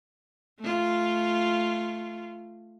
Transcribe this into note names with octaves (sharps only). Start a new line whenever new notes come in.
A3 F4